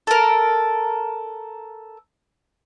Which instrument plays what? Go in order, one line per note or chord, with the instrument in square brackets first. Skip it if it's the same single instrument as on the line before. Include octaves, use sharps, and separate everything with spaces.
[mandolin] A4 A#4